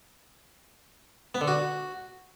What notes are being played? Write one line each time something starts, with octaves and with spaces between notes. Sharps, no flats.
B3
D3
F#4